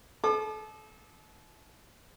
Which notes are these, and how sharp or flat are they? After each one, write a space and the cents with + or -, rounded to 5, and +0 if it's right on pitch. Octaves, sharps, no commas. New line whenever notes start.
A4 -35 D6 +40